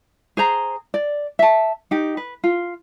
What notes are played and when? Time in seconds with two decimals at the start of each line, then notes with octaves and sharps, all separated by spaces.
0.37 G#4 C5 A#5
0.94 D5
1.39 E5 A5
1.91 D#4 G4
2.17 B4
2.44 F4